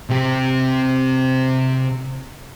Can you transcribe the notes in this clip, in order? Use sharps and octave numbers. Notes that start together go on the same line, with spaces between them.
C3 G4